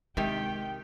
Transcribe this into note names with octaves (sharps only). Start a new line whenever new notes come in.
C3 D#3 G#3 G4 G5